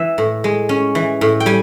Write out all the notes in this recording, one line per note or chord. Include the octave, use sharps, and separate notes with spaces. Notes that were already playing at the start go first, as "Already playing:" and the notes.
Already playing: E3 E5
A2
G#3
C#4
E3
A2
G5
G3 G#5